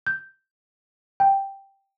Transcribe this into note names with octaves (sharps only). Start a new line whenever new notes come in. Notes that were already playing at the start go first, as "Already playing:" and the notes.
G6
G5